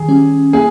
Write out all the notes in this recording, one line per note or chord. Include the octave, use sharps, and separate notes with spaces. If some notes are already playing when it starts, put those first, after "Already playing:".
Already playing: D#3 G#4
G3 C#4
A#3 G#4